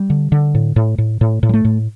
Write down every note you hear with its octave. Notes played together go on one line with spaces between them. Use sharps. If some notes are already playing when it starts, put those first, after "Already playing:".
Already playing: G3
D3
D3
A2
A2
A2
A2
A2
G3
A3
A2